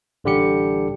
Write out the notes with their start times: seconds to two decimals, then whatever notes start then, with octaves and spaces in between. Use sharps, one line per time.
0.24 A1 D3 G3 G4 C#7